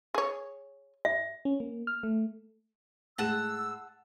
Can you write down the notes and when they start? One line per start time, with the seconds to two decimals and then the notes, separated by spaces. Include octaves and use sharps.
0.14 G#4 C#5
1.05 E5
1.45 C#4
1.60 A#3
1.87 F6
2.03 A3
3.18 A2 G#3 F#5 A5 E6 E7